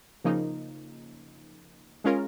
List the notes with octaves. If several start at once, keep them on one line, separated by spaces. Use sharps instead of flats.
C#3 F3 A#3 D#4
G#3 C#4 F4 A#4